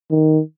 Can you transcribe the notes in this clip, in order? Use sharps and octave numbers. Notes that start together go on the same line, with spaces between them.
D#3